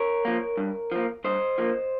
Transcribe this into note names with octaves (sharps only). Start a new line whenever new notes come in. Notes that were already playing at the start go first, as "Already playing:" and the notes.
Already playing: A#4 C#5
F3 A#3
G2
F3 A#3
G2 C5 D#5
F3 A#3